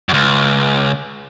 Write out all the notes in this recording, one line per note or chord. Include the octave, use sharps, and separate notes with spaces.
C#2 F#2